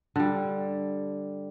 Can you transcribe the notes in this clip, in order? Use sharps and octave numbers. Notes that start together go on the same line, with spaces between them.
D3 G3